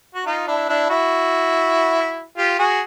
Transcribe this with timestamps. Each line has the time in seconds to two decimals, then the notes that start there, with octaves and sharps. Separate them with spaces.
0.15 F#4
0.26 D#4 F4
0.47 D4 E4
0.69 D4 E4
0.90 E4 F#4
2.38 F4 G4
2.59 F#4 G#4